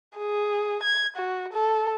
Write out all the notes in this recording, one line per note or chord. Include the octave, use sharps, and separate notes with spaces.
G#4
G#6
F#4
A4